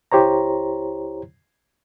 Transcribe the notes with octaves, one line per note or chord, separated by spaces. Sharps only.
C#2 E4 G4 C5 C#5 A#5